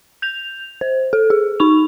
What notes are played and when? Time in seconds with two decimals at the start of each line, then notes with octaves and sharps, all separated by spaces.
0.22 G6 F7
0.81 C5
1.13 A4
1.30 G#4
1.60 D#4 C#6 F7